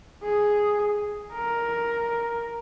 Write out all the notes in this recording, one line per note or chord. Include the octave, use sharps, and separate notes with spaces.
G#4
A#4